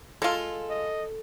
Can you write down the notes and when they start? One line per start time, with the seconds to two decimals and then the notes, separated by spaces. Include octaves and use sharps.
0.22 G#3 F4 A4
0.70 D#5